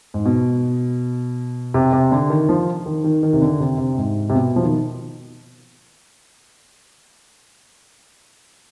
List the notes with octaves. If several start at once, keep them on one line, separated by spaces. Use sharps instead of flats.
G#2
B2
C3
C3
D3
D#3
F3
D#3
D#3
D#3
C3
D3
C3
C3
G#2
C3
B2
F3
D#3